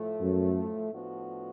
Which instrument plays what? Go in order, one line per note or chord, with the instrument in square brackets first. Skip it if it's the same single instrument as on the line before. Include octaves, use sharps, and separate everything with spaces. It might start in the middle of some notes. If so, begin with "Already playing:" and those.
Already playing: [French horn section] A2 F3 A3
[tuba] F#2
[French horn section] A2 F3 B3 D4 F#4